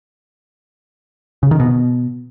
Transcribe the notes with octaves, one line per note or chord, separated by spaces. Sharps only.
C#3
D#3
B2